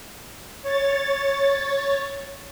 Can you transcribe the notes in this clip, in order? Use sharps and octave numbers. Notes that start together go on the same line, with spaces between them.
C#5 A6